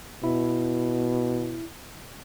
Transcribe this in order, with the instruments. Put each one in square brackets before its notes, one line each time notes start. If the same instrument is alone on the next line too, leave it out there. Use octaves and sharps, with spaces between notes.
[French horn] B2 [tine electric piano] E4